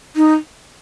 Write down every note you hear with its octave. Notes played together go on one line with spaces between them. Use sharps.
D#4